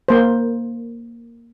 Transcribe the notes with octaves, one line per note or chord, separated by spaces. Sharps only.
A#3 C5